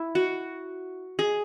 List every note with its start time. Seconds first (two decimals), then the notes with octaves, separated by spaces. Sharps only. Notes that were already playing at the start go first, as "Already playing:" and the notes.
Already playing: E4
0.15 F#4
1.19 G#4